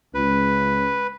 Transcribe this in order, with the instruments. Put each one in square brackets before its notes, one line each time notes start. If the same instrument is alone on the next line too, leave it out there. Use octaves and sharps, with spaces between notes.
[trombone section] C#2 [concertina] B4